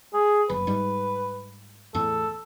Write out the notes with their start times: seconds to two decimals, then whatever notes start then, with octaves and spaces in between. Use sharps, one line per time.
0.14 G#4
0.50 F#1 B4
0.67 G#2 G3
1.95 E2 A2 A4